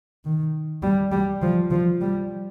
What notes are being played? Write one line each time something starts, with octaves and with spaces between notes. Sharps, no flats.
D#3
G3
G3
F3
F3
G3